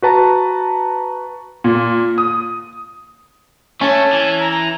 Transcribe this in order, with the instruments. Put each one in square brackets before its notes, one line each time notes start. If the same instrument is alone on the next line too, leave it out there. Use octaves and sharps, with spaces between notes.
[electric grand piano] F#4 B4 A5 A#5
[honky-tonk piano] A#2
D#6
[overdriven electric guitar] A3 [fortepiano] C#4 [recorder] A5
[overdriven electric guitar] E3
[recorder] A#5
A#5